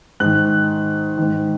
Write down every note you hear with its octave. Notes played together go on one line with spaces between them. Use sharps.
G#2 D#3 F#6
G#2 D#3